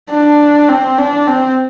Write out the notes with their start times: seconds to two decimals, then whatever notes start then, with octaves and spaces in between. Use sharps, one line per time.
0.10 D4
0.69 C4
0.98 D4
1.27 C4